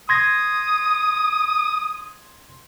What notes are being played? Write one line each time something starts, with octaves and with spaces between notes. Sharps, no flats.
C6 D#6 G#6 A#6